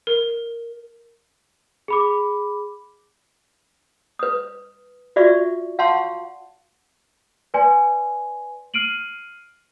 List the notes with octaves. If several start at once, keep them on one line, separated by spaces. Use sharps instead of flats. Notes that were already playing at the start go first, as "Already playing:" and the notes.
A#4
G#4 B5 D6
B4 D#6
F4 F#4 D5 E5 C#6
F5 F#5 A5 C6 C#6
B4 D5 G#5 C6
F6 C7 D7 D#7 F#7